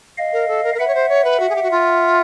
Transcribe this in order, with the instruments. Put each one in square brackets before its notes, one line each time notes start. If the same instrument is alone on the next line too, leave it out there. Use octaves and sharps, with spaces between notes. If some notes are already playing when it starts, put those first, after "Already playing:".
[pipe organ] D#5 F5
[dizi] A#4
A4
A#4
A#4
[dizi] B4 [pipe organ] E5 F#5
[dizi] C#5
C5
C#5
B4
F#4
G#4
G4
F#4
F4